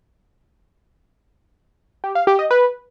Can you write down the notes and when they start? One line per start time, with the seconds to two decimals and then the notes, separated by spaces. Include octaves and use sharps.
2.04 G4
2.15 F5
2.27 G4
2.39 D#5
2.51 B4